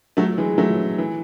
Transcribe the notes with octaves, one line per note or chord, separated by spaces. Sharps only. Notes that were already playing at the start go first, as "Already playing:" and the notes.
F#3 A3
E3 G#3
F#3 A3
E3